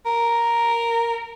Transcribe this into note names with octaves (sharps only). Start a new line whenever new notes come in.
A#4